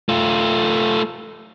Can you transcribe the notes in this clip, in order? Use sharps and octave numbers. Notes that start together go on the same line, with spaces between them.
A3 F4